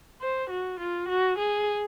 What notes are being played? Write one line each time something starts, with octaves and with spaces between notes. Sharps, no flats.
C5
F#4
F4
F#4
G#4